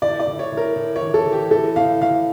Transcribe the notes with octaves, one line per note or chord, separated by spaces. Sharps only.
A2 D5
D5
A2
C#5
A2
A#4
A2
C#5
E3
A4
E3
G4
A2 A4
A2 F5
A2 F5